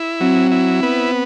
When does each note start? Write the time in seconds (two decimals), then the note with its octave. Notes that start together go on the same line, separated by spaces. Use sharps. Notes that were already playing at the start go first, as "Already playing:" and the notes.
Already playing: E4
0.20 F#3 C4
0.51 E4
0.83 B3